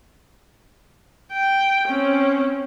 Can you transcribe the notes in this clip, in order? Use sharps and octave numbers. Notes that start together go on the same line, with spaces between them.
G5
C4 C#4